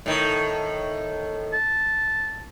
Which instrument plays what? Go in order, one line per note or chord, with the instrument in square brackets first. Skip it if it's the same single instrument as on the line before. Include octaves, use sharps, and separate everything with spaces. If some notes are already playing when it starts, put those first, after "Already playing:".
[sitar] A2 D#3
[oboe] A5